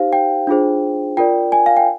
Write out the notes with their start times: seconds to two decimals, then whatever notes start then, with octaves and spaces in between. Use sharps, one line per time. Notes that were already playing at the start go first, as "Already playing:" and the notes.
Already playing: D#4 G4 C5 F5
0.13 G5
0.47 D4 F4 G#4 C5
1.17 F4 A#4 D5 G5
1.52 G#5
1.66 F5
1.77 G5